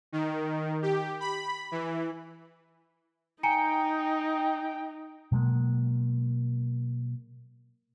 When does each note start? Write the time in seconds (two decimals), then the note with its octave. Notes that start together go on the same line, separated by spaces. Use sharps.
0.12 D#3
0.82 G4
1.20 B5
1.72 E3
3.43 D#4 G5 G#5 A#5 C#7
5.32 B2 F#3 G#3 A#3